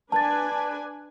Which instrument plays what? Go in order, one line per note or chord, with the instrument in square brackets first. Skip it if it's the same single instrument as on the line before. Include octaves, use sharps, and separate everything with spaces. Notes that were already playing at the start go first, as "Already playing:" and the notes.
[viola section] D4 B4 G#5 [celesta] A5 A6